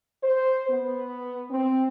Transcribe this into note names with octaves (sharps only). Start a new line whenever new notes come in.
C5
B3
C4